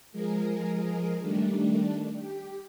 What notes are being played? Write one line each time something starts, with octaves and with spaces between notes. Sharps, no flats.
F3 G#3 G#4 A#4
D#3 G3 A3 D4
G4